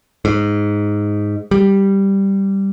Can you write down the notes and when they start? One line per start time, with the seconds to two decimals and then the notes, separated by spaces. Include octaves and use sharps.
0.25 G#2
1.51 G3